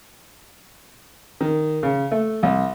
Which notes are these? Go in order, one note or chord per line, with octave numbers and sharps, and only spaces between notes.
D#3
C#3
A3
C2